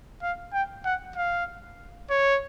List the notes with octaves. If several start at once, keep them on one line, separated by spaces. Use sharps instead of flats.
F5
G5
F#5
F5
C#5